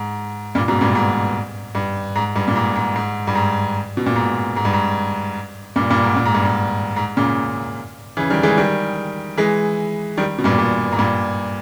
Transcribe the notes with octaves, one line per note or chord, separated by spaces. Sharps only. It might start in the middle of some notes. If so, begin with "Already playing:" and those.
Already playing: G#2
G2 A#2
G#2 B2
G2 A#2
G#2
G2
G#2
G2
A#2
G#2
G#2
G#2
G2
G#2
B2
A#2
G#2
G#2
G2
G#2
G2 A#2
G2 A#2
G#2
A#2
G#2
G2
G#2
G#2
A#2 C#3
C#3 E3
D#3 G3
E3 G#3
D#3 G3
E3 G#3
D#3 G3
B2
G2 A#2
G2 A#2
G#2
G2 A#2